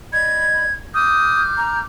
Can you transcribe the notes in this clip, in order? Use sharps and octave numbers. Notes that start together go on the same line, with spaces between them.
D5 D#5 B5 G#6
D6 D#6 F6 G6
A#5